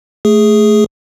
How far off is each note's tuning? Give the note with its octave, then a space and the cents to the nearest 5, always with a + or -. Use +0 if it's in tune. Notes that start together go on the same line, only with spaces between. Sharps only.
A3 -10 G#4 +0